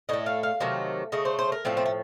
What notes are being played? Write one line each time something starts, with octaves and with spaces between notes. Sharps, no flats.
A2 A3 D#5
F5
F5
C3 D#3 F#3 A3
C#3 A3 D#5
C5
C5
A#4
A2 F3 A3 C4
C4
A3